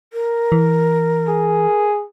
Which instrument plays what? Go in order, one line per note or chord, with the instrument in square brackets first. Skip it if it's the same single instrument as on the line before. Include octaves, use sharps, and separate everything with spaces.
[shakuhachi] A#4
[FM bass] E3
[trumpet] G#4